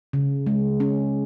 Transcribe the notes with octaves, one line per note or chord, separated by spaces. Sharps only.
C#3
G#3
C#4